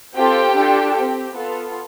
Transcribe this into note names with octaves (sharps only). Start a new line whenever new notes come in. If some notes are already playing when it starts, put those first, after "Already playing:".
C4 F4 G4 A4 G5
D4 F4 A4
G4
C4
B3 F4 A4